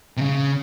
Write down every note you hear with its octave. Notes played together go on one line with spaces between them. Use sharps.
C3
C#3